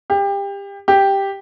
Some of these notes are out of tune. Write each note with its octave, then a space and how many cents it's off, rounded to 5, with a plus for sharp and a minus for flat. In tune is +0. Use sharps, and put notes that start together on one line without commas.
G4 +25
G4 +0